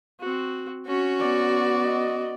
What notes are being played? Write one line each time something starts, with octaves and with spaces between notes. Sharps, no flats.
C4 F#4
C#4 F#4
B3 D5
D#5